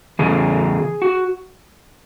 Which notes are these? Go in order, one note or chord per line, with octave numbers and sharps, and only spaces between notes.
E2 C#3 G#4
F#4